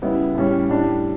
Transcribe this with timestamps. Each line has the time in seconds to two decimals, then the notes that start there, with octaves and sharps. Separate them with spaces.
0.02 C#3 G3 B3 E4
0.35 A2 G3 C#4
0.69 A2 G3 D4